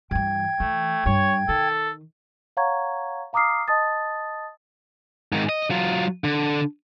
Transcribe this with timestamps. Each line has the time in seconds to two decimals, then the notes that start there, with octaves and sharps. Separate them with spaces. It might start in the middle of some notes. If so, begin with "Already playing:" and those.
0.11 G2 E3 G5 G#6
0.60 E3 A3
1.06 G2 C#5
1.49 D#3 A4
2.57 C#5 F5 F#5 A#5 C#6 G#6
3.33 F5 A#5 D6 D#6 F6 C7
3.68 D#5 A5 D#6 A6
5.32 G#2 D#3
5.49 D#5
5.70 F#3 F4
6.24 D3